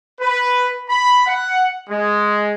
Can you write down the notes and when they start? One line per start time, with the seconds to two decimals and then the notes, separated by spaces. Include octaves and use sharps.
0.20 B4
0.89 B5
1.26 F#5
1.89 G#3